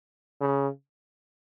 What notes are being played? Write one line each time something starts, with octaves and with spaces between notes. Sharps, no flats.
C#3